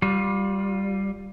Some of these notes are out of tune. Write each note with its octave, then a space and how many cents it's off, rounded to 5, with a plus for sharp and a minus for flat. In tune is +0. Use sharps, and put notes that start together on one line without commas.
G3 +0 F4 +25